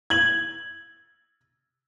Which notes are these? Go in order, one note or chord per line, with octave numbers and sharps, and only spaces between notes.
G#6 F#7